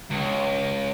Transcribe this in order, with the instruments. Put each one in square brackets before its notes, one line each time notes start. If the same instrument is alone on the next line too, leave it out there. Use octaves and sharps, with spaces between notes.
[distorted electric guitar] C#2